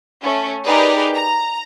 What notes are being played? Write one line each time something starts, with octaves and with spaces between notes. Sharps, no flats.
A3 C#4
D#4 G4 G#4 A#4 B4 D5
A#5